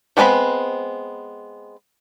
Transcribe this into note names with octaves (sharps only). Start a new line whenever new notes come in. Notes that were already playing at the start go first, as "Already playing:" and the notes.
F#3 G#3 B3 C4 B5